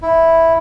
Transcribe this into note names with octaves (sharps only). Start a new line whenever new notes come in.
E4